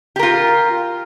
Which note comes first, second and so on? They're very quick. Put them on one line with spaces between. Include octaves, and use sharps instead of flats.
G4 A#4 F4